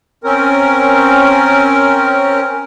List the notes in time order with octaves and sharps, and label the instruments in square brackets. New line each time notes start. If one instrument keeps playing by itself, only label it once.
[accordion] C4 C#4 A#4